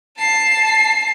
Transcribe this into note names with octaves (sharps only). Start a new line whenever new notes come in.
A5 C7